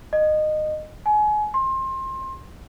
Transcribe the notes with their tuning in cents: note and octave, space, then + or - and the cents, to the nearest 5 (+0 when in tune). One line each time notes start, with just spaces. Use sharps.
D#5 -20
G#5 +30
C6 +25